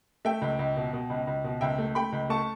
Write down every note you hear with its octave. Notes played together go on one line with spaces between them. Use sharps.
A3 E5 G5
C#2
C#2
B2
B2
C#2
C#2
B2
C#2 E5 G5
A3
A3 G5 B5
C#2
A3 A5 C#6